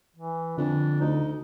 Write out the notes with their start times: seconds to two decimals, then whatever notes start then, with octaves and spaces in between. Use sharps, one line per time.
0.16 E3
0.58 F2 D3 D4
1.01 D2 D#4